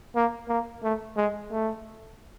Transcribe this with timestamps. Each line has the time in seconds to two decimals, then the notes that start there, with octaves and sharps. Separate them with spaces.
0.15 A#3
0.49 A#3
0.83 A3
1.17 G#3
1.51 A3